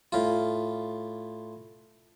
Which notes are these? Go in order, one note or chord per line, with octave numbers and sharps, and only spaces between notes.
A2 F4